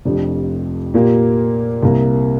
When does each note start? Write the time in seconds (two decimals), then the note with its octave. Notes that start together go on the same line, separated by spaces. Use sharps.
0.05 F1 F2 F3 D4 G4
0.94 A#2 A#3 G4
1.83 C2 C3 A#3